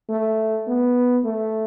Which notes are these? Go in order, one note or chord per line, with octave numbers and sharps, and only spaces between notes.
A3
B3
A3